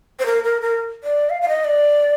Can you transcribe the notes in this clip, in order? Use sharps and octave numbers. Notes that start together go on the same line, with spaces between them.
C5
A#4
A#4
A#4
D5
F5
F5
D#5
D5